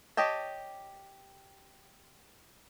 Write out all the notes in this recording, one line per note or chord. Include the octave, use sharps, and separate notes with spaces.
G4 C#5 D#5 G5 A5